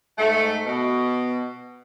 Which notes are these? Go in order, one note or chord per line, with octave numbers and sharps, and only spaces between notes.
G#2 A3
B2